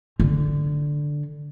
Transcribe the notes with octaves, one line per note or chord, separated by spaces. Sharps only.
D3